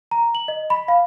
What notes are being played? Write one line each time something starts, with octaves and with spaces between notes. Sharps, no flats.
A#5
F#7
D#5
B5
F5